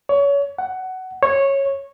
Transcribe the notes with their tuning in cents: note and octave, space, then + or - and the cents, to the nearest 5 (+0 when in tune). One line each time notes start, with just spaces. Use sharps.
C#5 +30
F#5 +15
C#5 -10